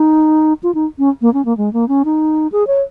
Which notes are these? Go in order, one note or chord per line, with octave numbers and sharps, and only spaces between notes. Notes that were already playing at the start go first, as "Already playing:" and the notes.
Already playing: D#4
F4
D#4
C#4
A#3
C#4
A#3
G#3
A#3
C#4
D#4
G#4
C#5